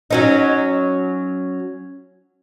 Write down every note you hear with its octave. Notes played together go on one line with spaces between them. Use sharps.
F#3 C#4 D#4